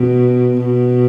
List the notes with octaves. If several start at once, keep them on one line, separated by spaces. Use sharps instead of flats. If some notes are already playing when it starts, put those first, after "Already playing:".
Already playing: B2
B2